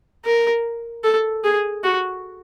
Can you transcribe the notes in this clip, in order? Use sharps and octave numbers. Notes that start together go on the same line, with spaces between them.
A#4
A4
G#4
F#4